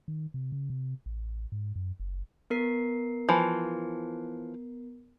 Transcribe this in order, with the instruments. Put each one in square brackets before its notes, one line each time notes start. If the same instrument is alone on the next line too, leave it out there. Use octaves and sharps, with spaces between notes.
[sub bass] D#3
C3
C#3
C3
A1
G#2
F#2
F#1
[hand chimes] B3 A#4 C7
[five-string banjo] E3 F3